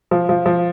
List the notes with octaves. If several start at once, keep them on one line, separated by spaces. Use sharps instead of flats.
F3
F3
F3